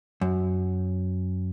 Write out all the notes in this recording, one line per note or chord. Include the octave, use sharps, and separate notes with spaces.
F#2